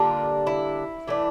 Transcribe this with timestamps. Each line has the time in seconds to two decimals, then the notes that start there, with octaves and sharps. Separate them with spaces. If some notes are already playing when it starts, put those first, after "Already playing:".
Already playing: D3 G3 A#3 D4 F4
0.47 E4
1.08 E3 A3 D4